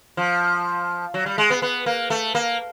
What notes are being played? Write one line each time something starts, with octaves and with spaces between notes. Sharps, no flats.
F3
F#3
G3
G#3
B3
B3
A#3
A3
A#3